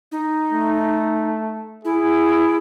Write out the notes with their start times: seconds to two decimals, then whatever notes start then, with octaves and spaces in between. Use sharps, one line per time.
0.12 D#4
0.52 A3
1.85 E4 G#4